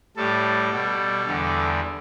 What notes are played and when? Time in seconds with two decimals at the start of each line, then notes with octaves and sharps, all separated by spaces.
0.16 A2 G3 A4
0.71 B2 G3
1.25 E2 D3 G3